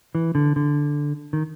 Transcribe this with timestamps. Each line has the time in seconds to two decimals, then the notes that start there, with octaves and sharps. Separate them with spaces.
0.15 E3
0.35 D3
0.56 D3
1.33 D#3